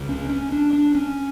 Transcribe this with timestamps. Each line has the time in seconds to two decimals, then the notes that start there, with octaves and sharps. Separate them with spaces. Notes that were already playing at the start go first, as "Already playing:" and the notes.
Already playing: C#2 C#3
0.09 C#4
0.30 C#4
0.52 D4
0.73 D4
0.95 C#4